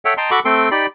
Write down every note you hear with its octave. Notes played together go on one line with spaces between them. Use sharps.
A4 C#5 E5 F#5 G5
D#5 G5 A5 A#5 C6
F#4 A4 F#5 B5 C#6 D6
A3 C4 A4 G5 C6
D#4 G4 D5 G5 B5